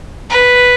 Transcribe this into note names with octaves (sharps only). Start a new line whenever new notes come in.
B4